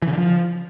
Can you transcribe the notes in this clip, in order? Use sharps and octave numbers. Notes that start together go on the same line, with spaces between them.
E3
C#3
D3
F3